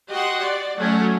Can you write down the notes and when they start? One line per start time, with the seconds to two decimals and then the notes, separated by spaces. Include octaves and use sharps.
0.11 F#4 G4 D#5 F#5 C6
0.42 D5
0.78 F#3 A3 C#4